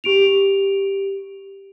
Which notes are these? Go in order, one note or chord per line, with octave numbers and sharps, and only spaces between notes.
G4 D7 F7